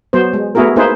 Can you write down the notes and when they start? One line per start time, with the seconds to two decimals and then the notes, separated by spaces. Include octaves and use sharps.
0.13 F#3 B3 C5
0.33 G#3
0.55 A3 B3 E4 F#4 G#4 A#4
0.76 A#3 D#4 E4 G#4 B4 C5